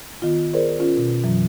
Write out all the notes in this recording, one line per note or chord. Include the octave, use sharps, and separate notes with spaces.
D#3 B3 F4
G#4 A#4 C5 D5
C#4 F4
B2
F#2 E3 F#3